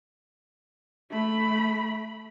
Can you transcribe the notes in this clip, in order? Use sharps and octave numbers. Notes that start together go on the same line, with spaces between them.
A3 B5